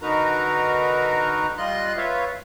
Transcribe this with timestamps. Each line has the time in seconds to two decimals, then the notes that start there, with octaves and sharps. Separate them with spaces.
0.02 D3 D#4 F#4 A#4 B4 A#5
1.58 G3 F4 D#5 C6 F#6
1.97 F4 B4 C#5 E5 F5